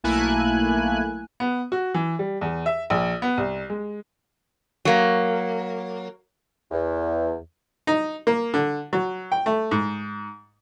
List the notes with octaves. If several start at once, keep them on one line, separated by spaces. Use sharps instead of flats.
B1 A3 A#3 E4 G#5 F#6
B3
F#4
E3
G3
E2
E5
A#1
B3
C2
G#3
F#3 A#3
E2
D#4
A#3
D3
F#3
G5
A3
G#2